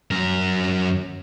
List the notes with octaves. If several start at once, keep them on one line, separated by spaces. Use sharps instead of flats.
F#2 A#4